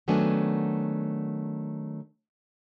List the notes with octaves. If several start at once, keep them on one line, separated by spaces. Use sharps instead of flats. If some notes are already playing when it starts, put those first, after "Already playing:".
D#3 F#3 A3 B3 D4 G#5